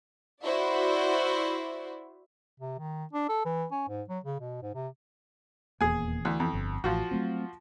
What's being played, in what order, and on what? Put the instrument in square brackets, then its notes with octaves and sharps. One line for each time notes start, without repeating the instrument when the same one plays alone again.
[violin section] E4 F#4 C5 D5 E5
[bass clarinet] C3
D#3
D4
A4
E3
C#4
G#2
F#3
C#3
B2
G#2
C3
[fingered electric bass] D#1 E2 A#3 [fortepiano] G#4 G#5
[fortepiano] D2 [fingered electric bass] E3
[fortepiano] F2
[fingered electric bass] G1
[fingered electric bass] A1 [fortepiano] F3 F4 F#4
[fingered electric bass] F#3 A3 C4